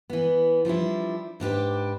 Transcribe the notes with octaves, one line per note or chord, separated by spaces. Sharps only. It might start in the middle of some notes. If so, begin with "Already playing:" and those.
E3 B3
F3 G3 D4 E4
G#2 D4 G4 B4